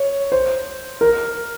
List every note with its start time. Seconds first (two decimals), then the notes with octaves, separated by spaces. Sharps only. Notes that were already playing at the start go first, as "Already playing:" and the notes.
Already playing: C#5
0.32 C5
1.01 A#4